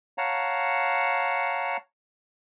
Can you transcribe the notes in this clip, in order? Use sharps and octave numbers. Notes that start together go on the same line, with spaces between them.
C#5 F5 F#5 A5 A#5